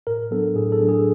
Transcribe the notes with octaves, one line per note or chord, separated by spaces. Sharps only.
A2 A#4
F#3 B3 D4 A4
A2 G#4
A4
F#3 B3 D4
G#4